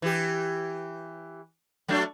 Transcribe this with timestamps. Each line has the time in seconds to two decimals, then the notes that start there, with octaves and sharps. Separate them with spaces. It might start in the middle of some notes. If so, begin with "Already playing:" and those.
0.02 E3 G4
1.88 F#3 A3 D4